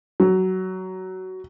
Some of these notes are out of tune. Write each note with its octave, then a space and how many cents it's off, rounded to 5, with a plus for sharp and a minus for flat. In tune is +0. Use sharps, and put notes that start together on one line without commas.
F#3 +15